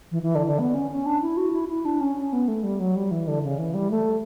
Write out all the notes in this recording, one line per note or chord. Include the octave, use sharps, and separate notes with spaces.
E3
E3
D3
D3
B3
C#4
C#4
D4
E4
F#4
E4
E4
D4
C#4
C#4
B3
A3
G3
F#3
G3
E3
D3
C#3
E3
G3
A3